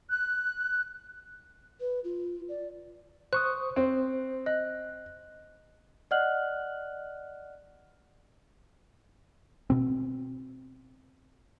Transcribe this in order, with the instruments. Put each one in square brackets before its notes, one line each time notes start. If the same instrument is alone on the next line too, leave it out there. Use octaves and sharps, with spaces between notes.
[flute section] F#6
[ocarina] B4
F4
D5
[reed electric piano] C5 C#6 D#6 [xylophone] F#6
[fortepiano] C4 [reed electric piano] C5
[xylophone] D#5 [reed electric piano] F#6
[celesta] D5 D#5 F#5 F6 F#6 F#7
[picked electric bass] B2 C4